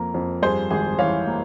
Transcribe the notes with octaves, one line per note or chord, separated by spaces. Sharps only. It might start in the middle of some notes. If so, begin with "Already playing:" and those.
Already playing: F2 A#3 A#4
F2
G2 G#4 C5
G#1 G#4
E3 C#5 F5
A#3